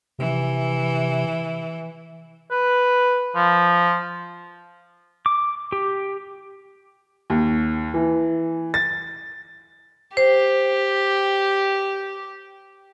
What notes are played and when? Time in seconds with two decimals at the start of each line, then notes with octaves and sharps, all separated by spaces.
0.19 C3 E3
2.51 B4
3.36 F3
5.26 D6
5.72 G4
7.30 D#2
7.94 E3
8.74 A6
10.17 G4 C5